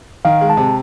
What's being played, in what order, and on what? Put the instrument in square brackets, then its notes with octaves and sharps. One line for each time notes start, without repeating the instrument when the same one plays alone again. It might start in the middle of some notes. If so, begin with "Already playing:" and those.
[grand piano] D#3 [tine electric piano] F5
[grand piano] G#3
[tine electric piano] A5
[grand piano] C3